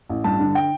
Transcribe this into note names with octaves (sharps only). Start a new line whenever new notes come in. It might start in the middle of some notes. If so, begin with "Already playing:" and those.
A1
G2 A5
D3
G5